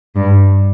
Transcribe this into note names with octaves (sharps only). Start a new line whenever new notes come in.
G2